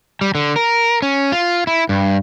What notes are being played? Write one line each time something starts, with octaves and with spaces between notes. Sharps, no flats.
G3
D3
A#4
C#4
F4
E4
G2